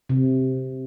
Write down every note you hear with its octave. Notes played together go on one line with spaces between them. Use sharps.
C3